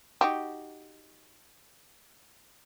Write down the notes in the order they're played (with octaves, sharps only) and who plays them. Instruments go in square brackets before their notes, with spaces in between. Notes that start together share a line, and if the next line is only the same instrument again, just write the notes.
[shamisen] D#4 F#4 G4